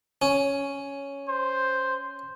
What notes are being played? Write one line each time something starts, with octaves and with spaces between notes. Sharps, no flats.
C#4
C5